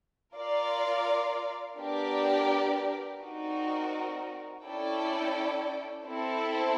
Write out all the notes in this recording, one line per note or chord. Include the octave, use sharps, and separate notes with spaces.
F4 A#4 D5 F5
B3 D4 G4 A#4 D5
C4 D#4 F#4 A#4 D5
C#4 E4 A4 D5 G5
C4 E4 A4